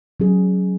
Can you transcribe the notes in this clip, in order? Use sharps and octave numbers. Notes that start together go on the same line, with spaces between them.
F#3 C#4 G#4